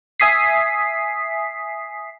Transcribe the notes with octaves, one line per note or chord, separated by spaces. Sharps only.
E5 G#5 D#6 B6 C7